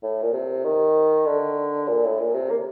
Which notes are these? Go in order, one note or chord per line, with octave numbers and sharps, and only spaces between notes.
A2
A#2
C3
D#3
D3
A#2
A2
A#2
C3
A#3